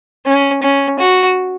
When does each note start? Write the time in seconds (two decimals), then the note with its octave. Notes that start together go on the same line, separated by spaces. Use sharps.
0.26 C#4
0.62 C#4
0.99 F#4